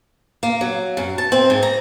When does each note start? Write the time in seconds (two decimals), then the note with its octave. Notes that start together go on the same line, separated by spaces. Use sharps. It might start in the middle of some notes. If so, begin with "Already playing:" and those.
0.43 A#3
0.61 F#3
0.97 F#2
1.18 A5
1.32 C4
1.50 G#2
1.63 A#5